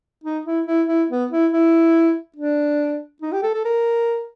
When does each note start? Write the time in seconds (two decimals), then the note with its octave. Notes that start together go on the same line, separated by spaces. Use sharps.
0.24 D#4
0.45 E4
0.67 E4
0.88 E4
1.10 B3
1.31 E4
1.52 E4
2.36 D4
3.22 D#4
3.32 G4
3.43 A4
3.54 A4
3.65 A#4